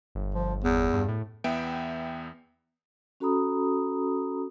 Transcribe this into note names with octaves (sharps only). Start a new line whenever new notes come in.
G1
F3
E2
G2
A2
E2 B3 E5 G5 D7
C#4 F#4 A4 A#5 B5 D#6